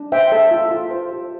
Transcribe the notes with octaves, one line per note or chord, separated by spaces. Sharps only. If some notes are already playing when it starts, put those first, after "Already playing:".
Already playing: D4
C5 E5 G5
A4 E5
F4
F4
C5
G4